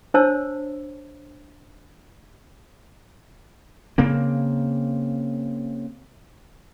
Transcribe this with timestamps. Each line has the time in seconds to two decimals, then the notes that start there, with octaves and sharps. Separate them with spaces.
0.14 D4 C5 C#5 A5 E6
3.98 C#3 A#3 C4